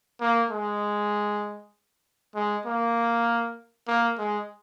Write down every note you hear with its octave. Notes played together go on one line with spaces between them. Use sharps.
A#3
G#3
G#3
A#3
A#3
G#3